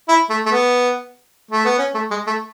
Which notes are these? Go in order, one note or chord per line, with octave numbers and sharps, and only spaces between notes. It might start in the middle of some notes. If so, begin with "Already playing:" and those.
E4
A3
A3
B3
A3
B3
C#4
A3
G#3
A3